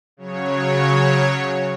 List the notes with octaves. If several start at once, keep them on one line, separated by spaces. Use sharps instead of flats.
C#3 F#3 C#5